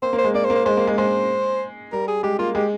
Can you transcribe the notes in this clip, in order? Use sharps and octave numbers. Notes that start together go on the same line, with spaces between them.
A#3 C5
A#3
C5
G#3
A#3 D5
C5
A#3
C5
G#3 C5
A#3
G#3
G#3 C5
G3 A#4
G#4
G#3 G4
A#3 F4
G#3 G4